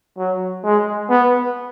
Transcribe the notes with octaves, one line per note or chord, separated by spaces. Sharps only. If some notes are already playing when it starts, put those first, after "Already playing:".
F#3
G#3
B3